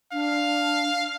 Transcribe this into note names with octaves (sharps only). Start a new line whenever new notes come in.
D4 F5